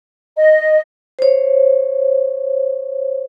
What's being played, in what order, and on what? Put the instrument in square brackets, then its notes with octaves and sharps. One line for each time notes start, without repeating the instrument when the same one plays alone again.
[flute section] D#5
[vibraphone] C5 C#5